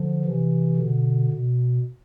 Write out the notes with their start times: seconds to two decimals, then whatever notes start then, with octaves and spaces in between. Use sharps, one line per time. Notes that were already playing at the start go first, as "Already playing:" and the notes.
Already playing: D3 F3
0.24 C3 E3
0.77 B2 D3
1.31 B2